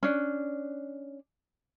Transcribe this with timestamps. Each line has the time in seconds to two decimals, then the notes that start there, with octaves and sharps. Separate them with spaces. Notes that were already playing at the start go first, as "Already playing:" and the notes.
0.03 C#4 D4